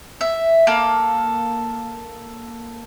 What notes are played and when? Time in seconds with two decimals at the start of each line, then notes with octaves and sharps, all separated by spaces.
0.21 E5
0.67 A#3 A4